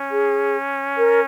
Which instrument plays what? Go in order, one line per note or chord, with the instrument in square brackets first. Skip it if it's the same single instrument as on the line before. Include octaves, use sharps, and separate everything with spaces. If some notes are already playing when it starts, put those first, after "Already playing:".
Already playing: [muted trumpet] C#4
[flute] G#4
A#4